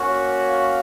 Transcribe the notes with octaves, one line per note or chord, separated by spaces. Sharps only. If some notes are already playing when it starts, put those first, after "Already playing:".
Already playing: A#3 C#4 F#4
F5